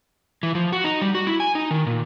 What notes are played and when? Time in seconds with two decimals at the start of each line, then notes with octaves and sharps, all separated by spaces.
0.43 E3
0.55 F3
0.73 F#4
0.84 D#4
1.01 G3
1.15 F#4
1.27 E4
1.40 G#5
1.55 D#4
1.71 D#3
1.87 A#2